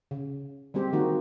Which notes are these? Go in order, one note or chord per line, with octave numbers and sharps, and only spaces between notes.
C#3
G3 G#3 C4 G4
D#3 F3 A#3 D#4 F#4